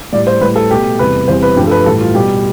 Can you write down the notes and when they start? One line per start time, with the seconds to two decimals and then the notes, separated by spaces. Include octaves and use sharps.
0.13 A2 G3 D5
0.27 C5
0.41 A2 G3 B4
0.56 A4
0.70 B2 A3 G4
0.99 E2 C3 G3 B4
1.28 E2 C3 E3 G3 C5
1.43 B4
1.57 G2 F3 A3 G4
1.67 A4
1.71 B4
1.86 A2 E3 G3 A4
2.01 F4
2.15 B2 G3 G4